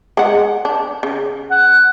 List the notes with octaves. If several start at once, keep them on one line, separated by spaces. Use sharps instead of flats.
G#3 F#5
D4
C#3
F#5